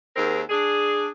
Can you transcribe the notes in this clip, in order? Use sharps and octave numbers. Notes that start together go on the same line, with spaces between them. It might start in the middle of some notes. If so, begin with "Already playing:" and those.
D#2 D#3 C4 G#4 A#4
D4 G#4